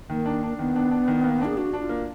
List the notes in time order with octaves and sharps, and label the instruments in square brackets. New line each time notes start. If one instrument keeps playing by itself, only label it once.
[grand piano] D#3 [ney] A#3
[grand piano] D4
D4
[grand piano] D#3 [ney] B3
[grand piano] D4
D4
D#3
A#3
[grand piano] D4 [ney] G#4
[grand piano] D4 [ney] F#4
[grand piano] D4
[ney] F4
[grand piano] A#3